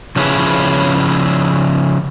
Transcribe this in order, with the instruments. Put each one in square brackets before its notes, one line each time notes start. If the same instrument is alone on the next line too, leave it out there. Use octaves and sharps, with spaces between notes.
[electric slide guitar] C#3 F3 C#4 E4 G#4 B4